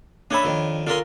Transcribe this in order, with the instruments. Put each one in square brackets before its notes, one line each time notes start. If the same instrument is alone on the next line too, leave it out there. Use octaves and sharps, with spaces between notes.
[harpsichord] C#4 E5 [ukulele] D4 C#5 B5
[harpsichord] F2 D#3
[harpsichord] D3 C#4 C6 [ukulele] F4 A#4